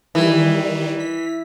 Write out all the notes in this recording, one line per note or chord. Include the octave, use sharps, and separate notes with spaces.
D#3 E3 G3
B6